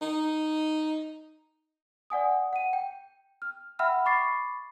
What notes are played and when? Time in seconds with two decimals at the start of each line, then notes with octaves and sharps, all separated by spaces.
0.02 D#4
2.10 D5 F#5 G#5 D#6
2.53 F#5 D#7
2.73 G5
3.42 F6
3.79 E5 F#5 G5 B5 E6 F6
4.06 B5 C#6 D6 A6 C7